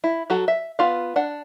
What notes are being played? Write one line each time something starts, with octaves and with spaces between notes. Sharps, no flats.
E4
F#3 F#4 A4
E5
B3 F4 F5
D4 F#5